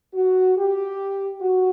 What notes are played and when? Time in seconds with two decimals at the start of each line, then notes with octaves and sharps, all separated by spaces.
0.14 F#4
0.57 G4
1.41 F#4